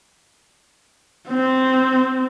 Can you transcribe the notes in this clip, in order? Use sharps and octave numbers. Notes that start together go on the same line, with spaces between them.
C4